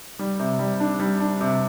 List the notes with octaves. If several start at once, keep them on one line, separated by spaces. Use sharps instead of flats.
G3
C3
G3
D4
G3
D4
C3